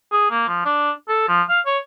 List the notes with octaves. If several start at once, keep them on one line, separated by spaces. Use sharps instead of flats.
G#4
A#3
F3
D4
A4
F3
F5
C#5